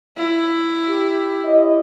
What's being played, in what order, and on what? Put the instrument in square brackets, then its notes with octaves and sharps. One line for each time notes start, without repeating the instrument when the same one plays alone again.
[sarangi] E4
[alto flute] G4
[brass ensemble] E4 C#5 D#5